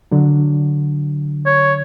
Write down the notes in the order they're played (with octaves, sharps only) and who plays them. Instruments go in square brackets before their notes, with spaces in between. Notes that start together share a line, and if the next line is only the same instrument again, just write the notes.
[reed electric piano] D3 F#3
[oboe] C#5